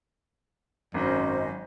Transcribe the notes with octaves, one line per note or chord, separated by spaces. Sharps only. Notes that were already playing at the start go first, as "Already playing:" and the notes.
G#1 F#2 C#4 C5 D#5